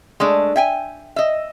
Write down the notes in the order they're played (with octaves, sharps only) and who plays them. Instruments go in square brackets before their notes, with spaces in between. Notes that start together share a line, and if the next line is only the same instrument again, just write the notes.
[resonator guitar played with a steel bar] G#3 A3 D4
E5 G5 G#5
D#5 E5